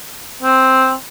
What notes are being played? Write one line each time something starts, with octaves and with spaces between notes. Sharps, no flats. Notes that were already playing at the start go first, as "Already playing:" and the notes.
C4